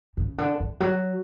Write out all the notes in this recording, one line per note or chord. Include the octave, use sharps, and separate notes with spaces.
C#3
D3
E3
F#3